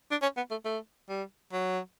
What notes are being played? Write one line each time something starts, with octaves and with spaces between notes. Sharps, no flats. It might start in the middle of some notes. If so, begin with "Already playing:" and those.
D4
C#4
B3
A3
A3
G3
F#3